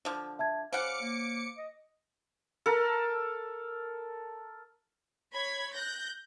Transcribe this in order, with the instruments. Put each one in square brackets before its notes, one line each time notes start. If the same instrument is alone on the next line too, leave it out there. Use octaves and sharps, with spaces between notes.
[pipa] D3 F3
[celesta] E5 A5 G#6
[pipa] C#3 F#5 [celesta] C5 [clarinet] F5 [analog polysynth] D6 C#7
[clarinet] A#3
D#5
[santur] A4 A#4
[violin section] C#5 B5 G#6
F#6 G6 A#6